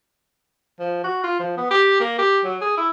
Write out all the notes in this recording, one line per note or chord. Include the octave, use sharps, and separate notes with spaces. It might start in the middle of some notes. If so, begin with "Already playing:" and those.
F3
F#4
F4
F3
B3
G4
A#3
G4
F#3
G#4
E4